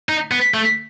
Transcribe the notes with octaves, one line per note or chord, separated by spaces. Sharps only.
D#4
B3
A3